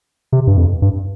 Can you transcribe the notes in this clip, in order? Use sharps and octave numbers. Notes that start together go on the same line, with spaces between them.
C3
G2
F2
G2